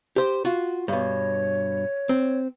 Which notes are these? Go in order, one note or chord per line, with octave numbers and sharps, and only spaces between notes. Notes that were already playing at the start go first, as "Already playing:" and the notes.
G4 C5
F4 F#4
G2 B2 C#5
C4